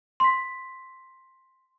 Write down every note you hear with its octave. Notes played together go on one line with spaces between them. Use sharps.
C6 B6